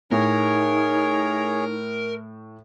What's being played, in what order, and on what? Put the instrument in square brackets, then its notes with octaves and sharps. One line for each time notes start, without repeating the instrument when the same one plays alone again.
[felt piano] A2 [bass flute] D#4 [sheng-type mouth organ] G#4 C#5 [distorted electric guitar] A#4